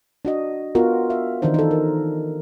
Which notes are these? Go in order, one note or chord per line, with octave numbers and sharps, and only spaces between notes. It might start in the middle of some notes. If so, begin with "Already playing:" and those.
D4 F#4 D#5
B3 F4 F#4 A#4
E5 F5
D#3 E3 D4 D#4 C5
D#4 A4
A#4